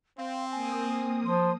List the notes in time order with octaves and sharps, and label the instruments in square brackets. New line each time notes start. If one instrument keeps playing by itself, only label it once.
[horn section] C4 [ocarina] F5
[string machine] A#3 D#6 [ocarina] G#5
[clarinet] F3 [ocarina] C6